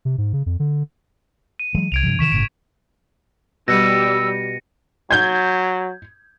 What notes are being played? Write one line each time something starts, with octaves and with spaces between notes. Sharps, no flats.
C3
G#2
C#3
F2
D3
D#7
E3 F#3 G#3
C2 G#6 D7 F7
G2 C3 F3
C3 D#3 E3 C#6 B6 E7
G1 A2 C#3 D7
B2 G3 E6 A#6 C#7 D#7
F#3 G6 G#6